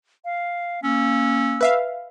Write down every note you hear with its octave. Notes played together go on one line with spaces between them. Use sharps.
F5
A#3 C#4 E6
B4 E5 F5